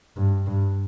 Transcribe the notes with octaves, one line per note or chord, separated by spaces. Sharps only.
G2
G2